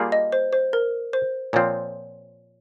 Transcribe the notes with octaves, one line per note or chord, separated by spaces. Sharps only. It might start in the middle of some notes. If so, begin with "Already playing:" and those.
Already playing: G3 A#3 F4 G#4
D#5
C5
C5
A#4
C5
A#2 F3 C4 C#5